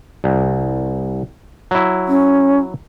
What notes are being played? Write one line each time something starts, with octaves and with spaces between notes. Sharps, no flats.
C2
F#3 E4
C#4